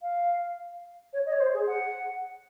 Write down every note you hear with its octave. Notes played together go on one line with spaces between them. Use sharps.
F5
C#5
D#5
C#5
C5
G#4
F#5